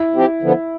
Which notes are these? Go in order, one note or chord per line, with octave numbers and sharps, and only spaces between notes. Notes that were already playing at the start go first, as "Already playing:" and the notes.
Already playing: E4
F3 C4 G4
D3 F3 B3